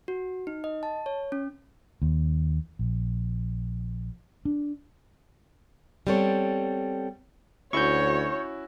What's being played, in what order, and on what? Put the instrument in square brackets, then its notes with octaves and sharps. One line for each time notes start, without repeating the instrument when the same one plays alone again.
[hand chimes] F#4
D#4
D#5
A5
C#5
C#4
[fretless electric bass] D#2
A#1
D4
[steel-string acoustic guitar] G3 B3 C4 A4 C#5
[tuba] D2 [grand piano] C#4 E4 F#4 [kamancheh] C#5 [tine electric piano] C#6 G6